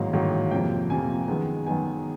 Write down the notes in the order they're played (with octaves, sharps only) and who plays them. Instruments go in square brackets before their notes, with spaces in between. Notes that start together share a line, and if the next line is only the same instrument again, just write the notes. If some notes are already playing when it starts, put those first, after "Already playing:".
Already playing: [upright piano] A1 G#2 D#3 F#3 A#3 F5
A1 G#2 D#3 F#3 A#3
F2 C3 F3 A#3 G5
F2 C3 F3 A#3 G#5
F#2 D#3 G#3 B3
F#2 D#3 G#3 B3 G#5